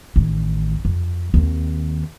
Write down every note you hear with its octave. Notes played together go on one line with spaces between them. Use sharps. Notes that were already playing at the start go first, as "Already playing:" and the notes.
A1 D#3
F2
D#2 C4